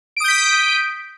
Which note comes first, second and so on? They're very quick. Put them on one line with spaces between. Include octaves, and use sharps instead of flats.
D7 D#6 G6 B6